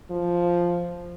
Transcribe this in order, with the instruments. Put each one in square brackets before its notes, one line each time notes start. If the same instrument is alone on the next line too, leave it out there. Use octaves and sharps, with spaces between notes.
[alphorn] F3